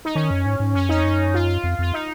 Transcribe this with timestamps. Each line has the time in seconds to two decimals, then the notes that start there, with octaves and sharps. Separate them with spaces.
0.05 D#4
0.15 D#3 C#4
0.31 F#2
0.46 G#2
0.60 G#2
0.75 F#2 C#4
0.89 F2 D#4
1.04 F#2
1.34 F4
1.48 F4
1.64 F2
1.79 F2 F4
1.93 D#4